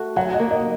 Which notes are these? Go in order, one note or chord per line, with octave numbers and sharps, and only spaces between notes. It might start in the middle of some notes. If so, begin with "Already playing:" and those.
Already playing: A3 F#4
F#3 F#5
D#5
A#3
D#5